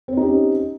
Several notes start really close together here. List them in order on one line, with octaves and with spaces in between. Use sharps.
C4 C5 D#4 G4 C#4